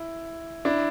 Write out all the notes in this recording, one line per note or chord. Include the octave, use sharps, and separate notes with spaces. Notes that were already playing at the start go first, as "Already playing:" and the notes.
Already playing: E4
D4 E4